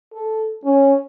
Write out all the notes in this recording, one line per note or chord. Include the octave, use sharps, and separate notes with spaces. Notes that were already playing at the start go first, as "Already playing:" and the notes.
A4
C#4